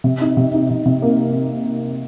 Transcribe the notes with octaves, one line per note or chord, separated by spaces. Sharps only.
C3
D#4
C3
D#4
C3
C3
A#3